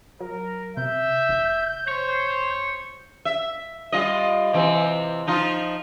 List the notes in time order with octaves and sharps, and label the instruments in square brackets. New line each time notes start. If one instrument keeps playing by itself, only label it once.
[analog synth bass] F#3 [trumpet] A#4
[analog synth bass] C3 [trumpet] E5 [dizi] G6
[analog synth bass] F1
[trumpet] C5 [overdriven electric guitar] C#5
[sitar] E5
G3 F4 D#5
C3 E3 C4
F3 D#4 F4